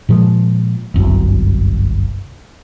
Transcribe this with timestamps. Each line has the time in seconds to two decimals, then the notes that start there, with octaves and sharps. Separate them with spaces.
0.09 A#2 F3 G#3
0.94 G1 C2 F#2